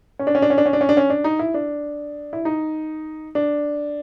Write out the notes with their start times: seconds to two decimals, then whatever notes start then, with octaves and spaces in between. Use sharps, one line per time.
0.19 C#4
0.27 D4
0.35 C#4
0.42 D4
0.50 C#4
0.58 D4
0.66 C#4
0.73 D4
0.81 C#4
0.89 D4
0.97 C#4
1.10 D4
1.24 D#4
1.39 E4
1.54 D4
2.33 E4
2.45 D#4
3.35 D4